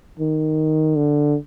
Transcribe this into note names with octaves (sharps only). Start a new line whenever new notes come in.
D#3
D3